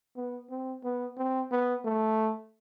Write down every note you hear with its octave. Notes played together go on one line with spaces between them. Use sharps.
B3
C4
B3
C4
B3
A3